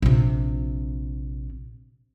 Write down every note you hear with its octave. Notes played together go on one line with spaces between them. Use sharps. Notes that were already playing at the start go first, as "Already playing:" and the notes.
A#1 C3